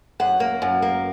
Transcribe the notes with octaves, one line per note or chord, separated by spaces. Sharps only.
F#2 F#5
A#3
F#2
A#3